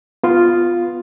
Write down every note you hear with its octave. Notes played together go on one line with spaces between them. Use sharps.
B3 F4